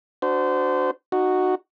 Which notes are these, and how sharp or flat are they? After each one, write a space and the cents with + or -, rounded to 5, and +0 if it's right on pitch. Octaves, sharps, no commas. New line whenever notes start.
D4 +0 F#4 +0 C5 -25
D#4 -20 F#4 +0